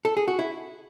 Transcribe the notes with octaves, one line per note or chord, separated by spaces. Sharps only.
A4
G#4
F#4
E4